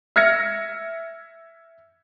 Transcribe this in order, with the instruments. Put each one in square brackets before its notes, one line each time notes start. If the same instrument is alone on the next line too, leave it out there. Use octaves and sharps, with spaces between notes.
[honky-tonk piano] E5 F6 G#6 A#6 C#7